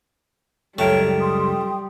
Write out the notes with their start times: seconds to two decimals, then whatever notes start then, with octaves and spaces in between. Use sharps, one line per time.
0.78 C#2 F#2 G3 A3 A#4 C#5 G5
1.20 G5 C6 D#6